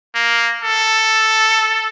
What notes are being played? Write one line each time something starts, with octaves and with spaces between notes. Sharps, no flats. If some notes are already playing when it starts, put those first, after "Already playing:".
A#3
A4